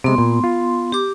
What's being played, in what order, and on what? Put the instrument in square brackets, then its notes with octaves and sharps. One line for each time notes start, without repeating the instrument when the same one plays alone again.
[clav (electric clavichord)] C3 G#3 [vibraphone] B3 C6
[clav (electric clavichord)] A#2
F4
[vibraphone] G4 D6